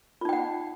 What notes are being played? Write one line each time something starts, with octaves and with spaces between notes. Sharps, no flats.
D#4 F4 F#5 G5